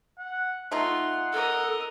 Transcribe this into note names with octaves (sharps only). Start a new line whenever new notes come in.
F#5
A3 D#4 F4 F#5 C6
A4 A#4 D#5